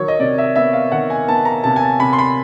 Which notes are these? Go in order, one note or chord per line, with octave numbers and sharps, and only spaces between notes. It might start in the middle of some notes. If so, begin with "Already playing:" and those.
Already playing: D#3 F#3 C#5
D#5
C3 D5
E5
B3 E5
F5
D#3 F#5
G#5
B3 A5
A#5
C3 A5
G#5
A5
C3 B5
C6
B5